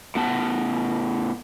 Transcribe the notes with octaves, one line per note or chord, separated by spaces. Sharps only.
A2 B3 A5